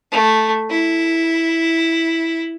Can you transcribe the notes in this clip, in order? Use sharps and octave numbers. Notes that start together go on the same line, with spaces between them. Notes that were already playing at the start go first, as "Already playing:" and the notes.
A3
E4